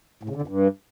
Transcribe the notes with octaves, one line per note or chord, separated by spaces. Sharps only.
A2
C#3
D3
F2
G2